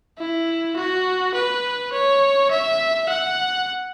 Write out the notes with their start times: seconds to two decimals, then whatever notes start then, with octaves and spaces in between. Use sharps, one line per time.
0.18 E4
0.76 F#4
1.34 B4
1.92 C#5
2.51 E5
3.09 F#5